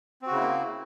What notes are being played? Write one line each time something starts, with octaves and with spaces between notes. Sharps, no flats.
C#3 A#3 C4 E4 F#4